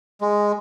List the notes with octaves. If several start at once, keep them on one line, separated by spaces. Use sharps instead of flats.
G#3